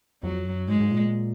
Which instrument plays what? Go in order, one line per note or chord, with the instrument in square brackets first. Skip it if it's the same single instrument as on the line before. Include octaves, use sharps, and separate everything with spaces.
[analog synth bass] F2 [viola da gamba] F#3
[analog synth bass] F#2
[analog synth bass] G#2 [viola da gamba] G#3
[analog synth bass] G#2
A#2